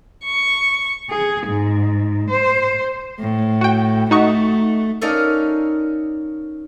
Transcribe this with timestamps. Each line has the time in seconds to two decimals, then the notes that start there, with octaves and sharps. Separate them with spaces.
0.24 C#6
1.08 G#4
1.46 G#2
2.30 C5
3.19 A2
3.61 F#4 G5
4.11 A3 D#4 F#4 C#6
5.01 C#4 D#4 A4 A#4 D5 F5